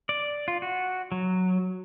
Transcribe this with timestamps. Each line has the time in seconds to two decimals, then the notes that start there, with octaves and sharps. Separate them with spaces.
0.09 D5
0.48 F4
0.62 F#4
1.12 F#3